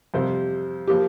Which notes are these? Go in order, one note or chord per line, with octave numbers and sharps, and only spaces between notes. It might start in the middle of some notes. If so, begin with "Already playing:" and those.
F2 C3 G3 C4 C5
F3 A#3 G4